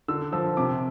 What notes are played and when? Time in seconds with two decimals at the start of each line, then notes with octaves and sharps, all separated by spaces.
0.08 D3 E6
0.33 F3 E6
0.57 C3 D6